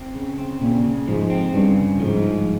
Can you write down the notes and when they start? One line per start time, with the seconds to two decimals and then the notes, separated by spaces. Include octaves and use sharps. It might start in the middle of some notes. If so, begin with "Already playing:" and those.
Already playing: C4
0.15 C#3
0.38 C4
0.61 A#2 C#3
0.84 C#3
1.08 G#2 F3
1.30 C4
1.53 G2 C#3
1.76 C#3
1.99 G#2 F3
2.22 F3